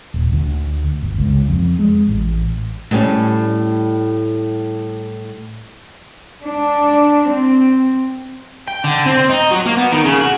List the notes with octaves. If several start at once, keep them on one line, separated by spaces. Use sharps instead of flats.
D#1
D2
G1
C#2
F2
G#3
A1
A2 G3 C#4
D4
C4
G5
D3
C4
D#4
F#3
A#3
B3
D#3
C#3
F#4